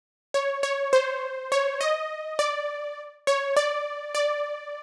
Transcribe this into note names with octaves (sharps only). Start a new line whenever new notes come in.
C#5
C#5
C5
C#5
D#5
D5
C#5
D5
D5